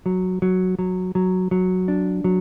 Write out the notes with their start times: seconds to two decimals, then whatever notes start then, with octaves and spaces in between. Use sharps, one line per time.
0.06 F#3
0.42 F#3
0.79 F#3
1.15 F#3
1.51 F#3
1.88 D4
2.24 F#3